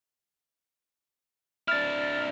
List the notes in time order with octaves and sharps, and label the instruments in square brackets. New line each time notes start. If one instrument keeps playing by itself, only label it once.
[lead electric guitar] D4 E4 [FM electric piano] F6 A6